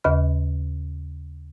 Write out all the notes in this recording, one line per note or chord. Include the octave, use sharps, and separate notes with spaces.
D#2 C#3 D#5 B5 F6